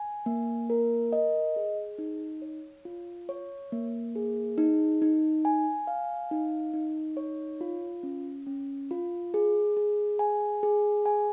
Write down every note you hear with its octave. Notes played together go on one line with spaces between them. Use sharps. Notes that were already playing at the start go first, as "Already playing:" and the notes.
Already playing: G#5
A#3
A#4
D#5
G#4
D#4
C#5
F4
C#5
A#3
G#4
D#4
D#4
G#5
F5
D#4
D#4
C#5
F4
C#4
C#4
F4
G#4
G#4
G#5
G#4
G#5